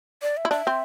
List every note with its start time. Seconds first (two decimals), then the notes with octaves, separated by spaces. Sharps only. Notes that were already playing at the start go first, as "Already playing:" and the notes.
0.22 D5
0.37 E5
0.45 E4
0.51 D4 E5
0.67 C4